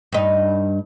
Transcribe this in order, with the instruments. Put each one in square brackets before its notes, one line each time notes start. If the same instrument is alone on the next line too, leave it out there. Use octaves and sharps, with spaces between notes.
[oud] G2 D#4